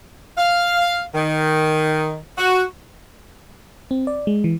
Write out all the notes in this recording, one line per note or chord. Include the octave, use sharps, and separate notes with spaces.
F5
D#3
F#4
C4
D5
G#3
E3